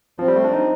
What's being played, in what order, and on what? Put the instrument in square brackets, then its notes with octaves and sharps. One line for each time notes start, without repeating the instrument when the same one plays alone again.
[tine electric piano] F3 [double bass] C4
[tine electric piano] G3
A3
D4
D#4